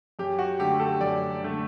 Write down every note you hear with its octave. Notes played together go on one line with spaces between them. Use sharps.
F#2 G4
F#4
D3 A3 G4
A4
F#2 D5
D3 A3